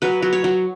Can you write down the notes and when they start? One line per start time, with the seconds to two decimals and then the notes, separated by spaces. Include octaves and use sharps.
0.02 F#3 B4
0.22 F#3
0.33 C#5
0.44 F#3